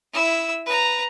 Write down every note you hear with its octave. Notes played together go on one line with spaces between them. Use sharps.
E4 E6
B4 A#5